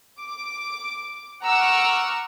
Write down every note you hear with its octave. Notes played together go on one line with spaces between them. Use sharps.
D6
F#5 A#5 C#6 D6 E6 F6